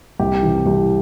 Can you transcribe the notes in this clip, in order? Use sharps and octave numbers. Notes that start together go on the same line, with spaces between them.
C2 G4
C3 E3
C2